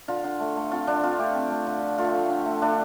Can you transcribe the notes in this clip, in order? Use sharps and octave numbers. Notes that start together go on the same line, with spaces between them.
D3 F4
D3
A3
A3
C4 F4
D3 D4
C4 F4
A3 G4
C4
A3
D3
F3
A3 F4
F3
D3
A3
A3 D4